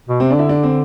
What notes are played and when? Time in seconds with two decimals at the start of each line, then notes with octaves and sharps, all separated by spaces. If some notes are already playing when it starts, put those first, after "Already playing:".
0.09 B2
0.20 C3 C4
0.30 D4
0.35 D3 E4
0.49 D4
0.63 C4